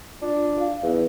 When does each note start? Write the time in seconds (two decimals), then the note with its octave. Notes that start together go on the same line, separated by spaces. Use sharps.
0.22 D4 F4
0.59 F5
0.83 E2